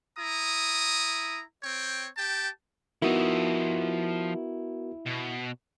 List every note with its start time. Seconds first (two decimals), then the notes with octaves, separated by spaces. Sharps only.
0.16 E4 A#5 D#6
1.63 C4 C#5 G5
2.17 G4 G5 A5
3.02 F3 B3 D#4 E4 F#4 A#4 D#5
5.06 B2